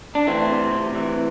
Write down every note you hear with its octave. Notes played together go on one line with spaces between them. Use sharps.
D4
E3 A3 C4
C3
C3
E3